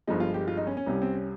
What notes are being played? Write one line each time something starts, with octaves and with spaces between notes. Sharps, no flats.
G1 G2 F3 G#3 D#4
F4
G4
F4
D#4
C#4
C#4
C2 C3 G3
C4
C#4